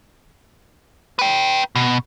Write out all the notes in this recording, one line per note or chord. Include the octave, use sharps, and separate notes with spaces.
B4 G5
B2